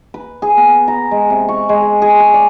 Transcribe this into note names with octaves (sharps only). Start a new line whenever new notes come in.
B4
G#4
B3
A#5
G#3
C3
C#6
G#3
G#5
G#4
G#4
D5